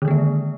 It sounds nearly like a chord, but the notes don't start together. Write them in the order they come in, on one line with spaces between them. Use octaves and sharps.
D3 D#3 G#3 A#3